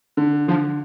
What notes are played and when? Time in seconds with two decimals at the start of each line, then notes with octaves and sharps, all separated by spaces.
0.17 D3
0.48 D3 F3